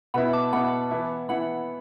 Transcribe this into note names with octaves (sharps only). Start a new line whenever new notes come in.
B2 B3 E4 F#5 B5
A5 D6
B2 B3 E4 F#5 B5
E3 B3 E4
E3 B3 E4 F#5 B5